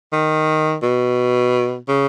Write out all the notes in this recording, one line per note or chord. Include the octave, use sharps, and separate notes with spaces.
D#3
B2
C#3